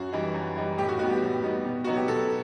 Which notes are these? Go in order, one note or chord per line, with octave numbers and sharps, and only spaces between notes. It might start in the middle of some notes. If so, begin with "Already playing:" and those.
Already playing: F#2 F#4
E3 G3 D#4
F#2
E3 G3 D#4
A2 G4
F#4
G3 B3 D#4 F#4
G4
A2
G3 B3 D#4
B2
F#3 B3 D#4 F#4
G4
B2 A4